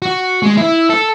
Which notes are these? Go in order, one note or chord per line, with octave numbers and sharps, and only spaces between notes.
F#4
G#3
E4
A4